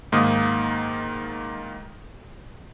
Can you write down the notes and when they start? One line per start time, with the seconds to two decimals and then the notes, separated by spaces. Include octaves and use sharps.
0.12 G#2 D#3 A#3 D#6